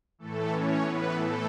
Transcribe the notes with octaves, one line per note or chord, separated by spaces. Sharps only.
A2 E3 A3 A4
C#4 C#5
B3 B4
A3 A4